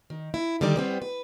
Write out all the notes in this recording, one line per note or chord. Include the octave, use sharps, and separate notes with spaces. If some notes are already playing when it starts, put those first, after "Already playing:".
D#3
E4
D3 D#3 G3 G4 D5
G3 B3 C4
B4